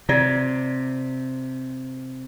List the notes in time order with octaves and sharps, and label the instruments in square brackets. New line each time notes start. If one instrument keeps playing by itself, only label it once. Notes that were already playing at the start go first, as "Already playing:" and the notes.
[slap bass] C3 [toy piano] F4 D5